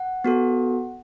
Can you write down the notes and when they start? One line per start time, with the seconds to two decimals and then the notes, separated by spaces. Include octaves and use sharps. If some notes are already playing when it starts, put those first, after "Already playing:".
Already playing: F#5
0.24 B3 F#4 A4